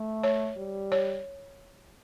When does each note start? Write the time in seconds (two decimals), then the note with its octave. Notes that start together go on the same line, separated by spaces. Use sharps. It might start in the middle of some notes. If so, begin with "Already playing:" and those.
Already playing: A3
0.24 C#5
0.57 G3
0.92 C#5